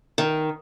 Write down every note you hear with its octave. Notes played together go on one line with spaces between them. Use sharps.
D#3